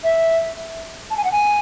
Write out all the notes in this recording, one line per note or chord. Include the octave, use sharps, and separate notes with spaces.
E5
A5
G#5
F#5
G#5